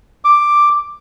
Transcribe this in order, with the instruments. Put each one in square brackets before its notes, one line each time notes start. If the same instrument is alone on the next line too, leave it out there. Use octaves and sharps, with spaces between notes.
[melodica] D6